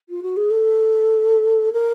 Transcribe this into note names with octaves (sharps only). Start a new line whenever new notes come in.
F4
F#4
G#4
A4
A#4